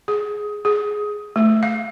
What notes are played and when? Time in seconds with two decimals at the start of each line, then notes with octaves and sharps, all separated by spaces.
0.08 G#4
0.65 G#4
1.36 A3
1.63 F5